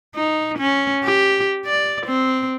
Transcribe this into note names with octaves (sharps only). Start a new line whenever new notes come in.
D#4
C#4
G4
D5
C4